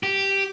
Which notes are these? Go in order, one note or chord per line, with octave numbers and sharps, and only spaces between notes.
G4